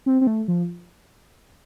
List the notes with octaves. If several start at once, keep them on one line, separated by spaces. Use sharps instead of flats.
C4
C4
A3
F3